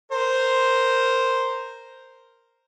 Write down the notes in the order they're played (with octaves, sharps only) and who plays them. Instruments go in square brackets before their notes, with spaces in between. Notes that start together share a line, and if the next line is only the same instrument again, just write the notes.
[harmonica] A#4 C5